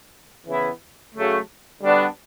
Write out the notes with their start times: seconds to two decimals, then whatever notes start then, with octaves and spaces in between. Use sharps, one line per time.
0.45 C#3 E3 B3 E4
1.13 C#3 F#3 A3
1.82 D3 G3 B3 D4 F#4